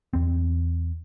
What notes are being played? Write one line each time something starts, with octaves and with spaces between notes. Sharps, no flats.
E2 C4